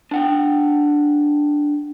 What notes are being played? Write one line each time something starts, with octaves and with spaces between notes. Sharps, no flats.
D4 F#5 G5